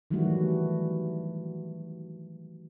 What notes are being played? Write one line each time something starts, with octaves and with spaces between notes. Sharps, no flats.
D#3 E3 F#3 G3 A3 F#4